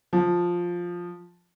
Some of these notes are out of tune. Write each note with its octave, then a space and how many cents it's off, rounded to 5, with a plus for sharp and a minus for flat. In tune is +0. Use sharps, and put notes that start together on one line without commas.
F3 +5